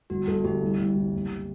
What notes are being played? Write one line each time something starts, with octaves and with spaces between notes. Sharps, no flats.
G1 F#4
G1 A4
G1 G4
C2
C2
C2
F#1